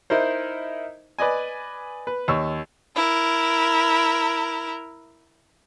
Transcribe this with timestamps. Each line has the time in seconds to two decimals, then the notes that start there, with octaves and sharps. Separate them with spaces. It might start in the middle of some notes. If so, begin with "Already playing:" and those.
0.10 D#4 E4 A#4 C5
1.19 B4 D5 D#5 G#5
2.07 B4
2.28 D#2 C#5 C#6 E6
2.96 E4 A#4